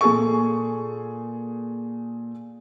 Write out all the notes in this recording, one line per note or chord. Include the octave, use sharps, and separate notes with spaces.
A#2 G#4 A4 C#6